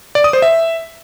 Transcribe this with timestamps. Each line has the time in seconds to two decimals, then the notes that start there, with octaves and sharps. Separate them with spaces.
0.15 D5
0.24 D#6
0.33 C5
0.42 E5